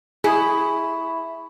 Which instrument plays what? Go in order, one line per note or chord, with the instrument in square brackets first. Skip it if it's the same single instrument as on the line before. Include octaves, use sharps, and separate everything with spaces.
[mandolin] E4 [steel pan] G#4 [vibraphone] B5 C#6